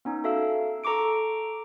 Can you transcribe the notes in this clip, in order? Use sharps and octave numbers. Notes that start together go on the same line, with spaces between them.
B3 C#4 D#4
F#4 A4 E5 F5 E6
A4 A#5 C#6 D6 D7